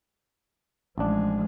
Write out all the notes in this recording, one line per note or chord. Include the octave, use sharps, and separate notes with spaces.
A1 F3 G#3 D4